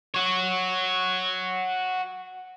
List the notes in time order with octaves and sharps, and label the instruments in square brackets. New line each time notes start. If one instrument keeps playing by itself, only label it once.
[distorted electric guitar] F#4 C#5